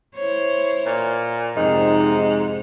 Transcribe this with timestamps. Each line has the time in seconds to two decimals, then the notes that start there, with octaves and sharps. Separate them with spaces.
0.16 E4 C5 C#5
0.86 A#2
1.57 F2 G#2 C3 C4 D#4